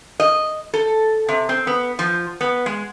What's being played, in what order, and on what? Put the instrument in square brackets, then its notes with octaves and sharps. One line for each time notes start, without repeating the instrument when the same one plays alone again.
[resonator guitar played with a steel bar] D#5
A4
C3
C4
B3
F3
B3
G#3